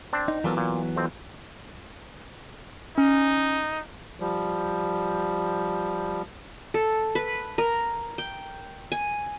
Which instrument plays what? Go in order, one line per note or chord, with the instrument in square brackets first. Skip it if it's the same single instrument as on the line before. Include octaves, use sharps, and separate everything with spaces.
[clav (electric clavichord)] C4 D4 A5
[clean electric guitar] D#4
[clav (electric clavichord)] A#2 A4 A#4 [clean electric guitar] E3 F#3 B3
[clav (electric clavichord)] A#2
F2 C4
[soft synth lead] C#4 [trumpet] D#4
[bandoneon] F3 G3
[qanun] A4
B4
A#4
G5
G#5